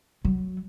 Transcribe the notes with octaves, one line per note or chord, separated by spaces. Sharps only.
F#3